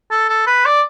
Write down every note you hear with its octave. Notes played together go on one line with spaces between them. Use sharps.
A4
A4
B4
D5